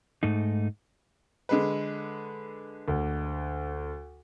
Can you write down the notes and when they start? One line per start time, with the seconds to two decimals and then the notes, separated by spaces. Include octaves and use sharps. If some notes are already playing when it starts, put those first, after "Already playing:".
0.23 G#2 A3 D#4
1.49 D3 G#3 B4
2.88 D2